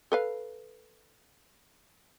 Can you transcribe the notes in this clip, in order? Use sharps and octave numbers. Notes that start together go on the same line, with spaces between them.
A4 B4 F5